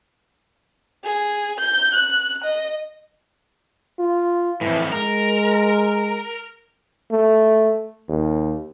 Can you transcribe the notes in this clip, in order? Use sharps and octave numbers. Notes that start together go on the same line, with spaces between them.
G#4
G6
F#6
D#5
F4
F2 A2 E3
G#3 A#4
A3
D#2